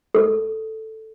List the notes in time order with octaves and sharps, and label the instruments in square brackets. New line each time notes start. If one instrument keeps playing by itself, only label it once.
[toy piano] A4